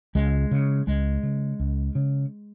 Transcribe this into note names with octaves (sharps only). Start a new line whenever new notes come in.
C#2 G#3
C#3
C#2 G#3
C#3
C#2
C#3